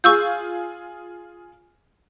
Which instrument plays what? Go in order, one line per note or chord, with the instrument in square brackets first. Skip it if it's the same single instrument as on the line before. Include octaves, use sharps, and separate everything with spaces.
[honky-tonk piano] F4 G#4 [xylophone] C#6 E6 G6